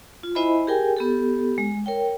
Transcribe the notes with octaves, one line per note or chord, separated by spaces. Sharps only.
F4
E4 C5 D#5 E5 G#5 B5
G4 G#4 A#4 G5 G#5
B3 G4 A4
G#3
A#4 C#5 G5